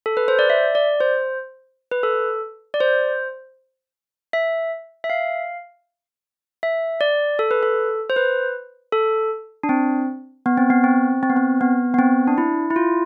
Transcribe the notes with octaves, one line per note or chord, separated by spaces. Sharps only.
A4
B4
C5
D5
E5
D5
C5
B4
A4
D5
C5
E5
E5
F5
E5
D5
A4
B4
A4
C5
B4
A4
D4
C4
B3
C4
B3
C4
C4
B3
C4
B3
B3
C4
D4
E4
E4
F4